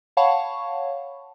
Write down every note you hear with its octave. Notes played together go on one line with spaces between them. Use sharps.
C#5 F5 F#5 A5 B5 C#6